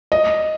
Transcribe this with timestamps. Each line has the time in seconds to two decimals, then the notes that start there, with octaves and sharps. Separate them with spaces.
0.12 D#5